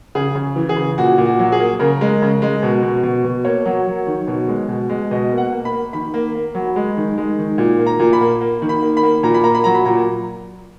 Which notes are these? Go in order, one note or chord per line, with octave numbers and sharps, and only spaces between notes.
C#3 G#4
C#3
E3
G#4
C#3
A#2 F#4
A#2
F#4
F#3
G#4
A#3
C#3 A#4
G#3
C#3
G#3
B2
B2
B2
B2
A#3 C#5
F#3
F#3
D#3
B2
G#3
B2
G#3
B2 D#5
A#3
F#5
A#3
B5
A#3
D#3 B5
A#3
A#3
F#3
G#3
D#3
G#3
D#3
A#2
A#3
A#5
A#2
B5
A#3
A#3
D#3
B5
A#3
B5
A#3
A#2 A#5
B5
A#3 A#5
B5
F#3 A#5
B5
A#2 A#5